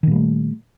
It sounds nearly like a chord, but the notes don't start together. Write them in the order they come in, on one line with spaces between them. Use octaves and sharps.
D#3 A#2 G3 A3